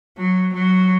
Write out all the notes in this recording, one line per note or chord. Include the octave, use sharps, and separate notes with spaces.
F#3
F#3